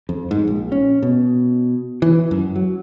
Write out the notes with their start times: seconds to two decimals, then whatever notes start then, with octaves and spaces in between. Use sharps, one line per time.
0.09 F2
0.31 G#2
0.47 A#1
0.72 C#4
1.03 B2
2.02 E3
2.31 F#2
2.56 F#3